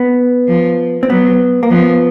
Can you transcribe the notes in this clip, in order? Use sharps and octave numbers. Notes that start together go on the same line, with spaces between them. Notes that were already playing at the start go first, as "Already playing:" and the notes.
Already playing: B3
F3
C4
F#3 B3
A#3
F3 B3